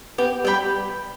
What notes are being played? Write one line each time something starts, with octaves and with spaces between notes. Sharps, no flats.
B3 G4
G3 D5 G5 B5